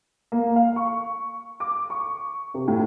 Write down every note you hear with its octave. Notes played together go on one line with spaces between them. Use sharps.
A#3
F5
C#6
D6
C#6
C3
A2